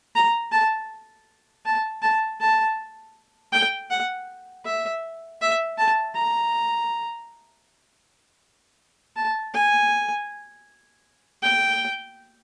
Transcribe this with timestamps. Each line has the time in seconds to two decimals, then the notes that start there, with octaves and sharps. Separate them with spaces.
0.15 A#5
0.52 A5
1.66 A5
2.02 A5
2.41 A5
3.52 G5
3.91 F#5
4.65 E5
5.41 E5
5.78 A5
6.15 A#5
9.16 A5
9.54 G#5
11.43 G5